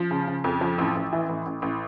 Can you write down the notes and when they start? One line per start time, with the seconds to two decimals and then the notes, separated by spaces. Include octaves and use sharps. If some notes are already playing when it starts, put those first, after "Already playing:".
Already playing: F3
0.11 C#3
0.28 C#3
0.44 F2
0.61 F3
0.78 A1
0.95 A1
1.13 E3
1.29 A1
1.46 A1
1.62 A1